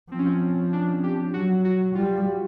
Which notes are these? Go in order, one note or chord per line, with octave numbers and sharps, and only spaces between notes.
F3 C4
C#4
C4
D4
G4
F#3 F#4
F#4
G3 F4